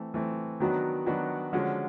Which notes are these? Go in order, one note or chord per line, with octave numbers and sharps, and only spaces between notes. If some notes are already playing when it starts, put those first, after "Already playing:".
Already playing: E3 A3 C4
E3 A3 C4
D#3 F#3 B3 D4 F#4
D#3 F#3 B3 D4 F#4
D3 F3 G#3 C#4 F#4